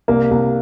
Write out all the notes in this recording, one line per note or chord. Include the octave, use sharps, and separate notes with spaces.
C2 A#3
C2